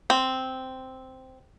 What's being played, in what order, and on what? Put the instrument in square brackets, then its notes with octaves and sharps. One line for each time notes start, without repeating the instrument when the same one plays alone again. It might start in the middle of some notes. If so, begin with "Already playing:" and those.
[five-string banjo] C4